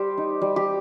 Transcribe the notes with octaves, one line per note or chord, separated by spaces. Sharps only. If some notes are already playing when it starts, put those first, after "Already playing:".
Already playing: G3 G4 C5
D#4
G3
G4